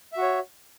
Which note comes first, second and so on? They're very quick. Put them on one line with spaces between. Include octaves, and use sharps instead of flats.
E5 F#4 C#5